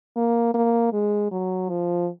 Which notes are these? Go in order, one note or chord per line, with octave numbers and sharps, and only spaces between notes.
A#3
A#3
G#3
F#3
F3